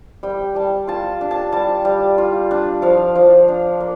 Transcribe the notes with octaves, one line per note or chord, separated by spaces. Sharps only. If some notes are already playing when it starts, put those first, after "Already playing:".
G3 G5
G3 A5
F4 A5
D4
A5
G3 A5
G3
F4
D4
F3 F5
F3
D4
A#3